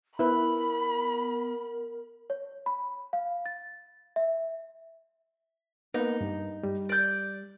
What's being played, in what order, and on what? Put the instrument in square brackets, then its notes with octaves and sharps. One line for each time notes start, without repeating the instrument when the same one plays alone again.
[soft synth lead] B3 [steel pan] E4 B4 [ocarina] A#4 [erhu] B5
[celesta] C#5
B5
F5
A6
E5
[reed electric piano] A#3 B3 [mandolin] D#4
[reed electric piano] G2
G3
[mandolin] D5 G6